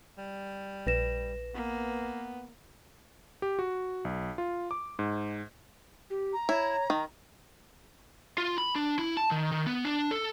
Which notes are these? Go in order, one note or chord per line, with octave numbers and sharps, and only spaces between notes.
G3
A#1 B4 A#6 E7
A#3 B3
G4
F#4
B1
F4
D6
G#2
G4
A#5
E4 C#5
D#3
F4
B5
D4
E4
A5
D#3
D#3
B3
D4
A4